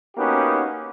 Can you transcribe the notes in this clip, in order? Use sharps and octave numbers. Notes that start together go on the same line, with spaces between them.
A#3 B3 C#4 D#4 F#4 G4